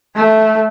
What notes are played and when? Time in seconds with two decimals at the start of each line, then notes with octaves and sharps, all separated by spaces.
0.16 A3